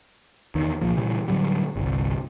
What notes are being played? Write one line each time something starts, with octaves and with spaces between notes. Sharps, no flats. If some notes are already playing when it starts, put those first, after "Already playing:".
E2 D#3
C2 A#2 F3 A#3
A#2 C#3 E3 G3
A2 D3 F#3 G3
G1 C2